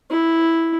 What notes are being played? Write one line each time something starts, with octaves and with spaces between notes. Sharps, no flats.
E4